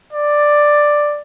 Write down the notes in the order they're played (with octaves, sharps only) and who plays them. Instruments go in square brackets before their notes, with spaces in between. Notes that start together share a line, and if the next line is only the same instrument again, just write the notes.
[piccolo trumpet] D5